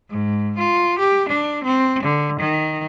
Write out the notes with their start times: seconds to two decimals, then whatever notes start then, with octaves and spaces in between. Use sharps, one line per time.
0.11 G#2
0.58 F4
0.99 G4
1.29 D4
1.64 C4
2.03 D3
2.40 D#3